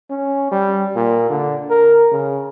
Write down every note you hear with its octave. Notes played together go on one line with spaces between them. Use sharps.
C#4
G3
A#2
D3
A#4
C#3